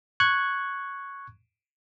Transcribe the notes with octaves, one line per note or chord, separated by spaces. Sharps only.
C#6 F#6 G#6